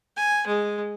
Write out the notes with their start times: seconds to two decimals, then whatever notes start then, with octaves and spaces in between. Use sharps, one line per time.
0.16 G#5
0.47 G#3